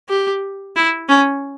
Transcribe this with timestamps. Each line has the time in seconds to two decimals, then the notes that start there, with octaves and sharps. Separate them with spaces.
0.09 G4
0.76 E4
1.09 C#4